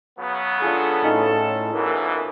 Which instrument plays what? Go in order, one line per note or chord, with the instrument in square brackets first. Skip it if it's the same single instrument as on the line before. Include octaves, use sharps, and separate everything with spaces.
[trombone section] C#3 F#3 B3
[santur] D4 F4 G#4 [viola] A4
[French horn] A2 [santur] C#4 D#4 B5
[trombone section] C2 B2 E3 [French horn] A#4